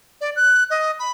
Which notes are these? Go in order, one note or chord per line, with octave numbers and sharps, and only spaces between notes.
D5
F#6
D#5
B5